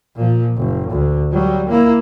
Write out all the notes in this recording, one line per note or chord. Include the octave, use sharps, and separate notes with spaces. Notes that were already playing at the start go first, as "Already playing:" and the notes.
A#2 F3
F#1
D2
F#3 G3
A#3 E4